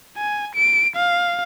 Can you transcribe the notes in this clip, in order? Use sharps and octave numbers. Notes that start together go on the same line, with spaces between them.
G#5
D7
F5